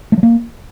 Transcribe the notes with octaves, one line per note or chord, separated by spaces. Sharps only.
A3
F#3
A#3